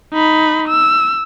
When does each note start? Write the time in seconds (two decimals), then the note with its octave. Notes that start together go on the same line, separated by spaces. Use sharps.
0.13 D#4 B5
0.68 E6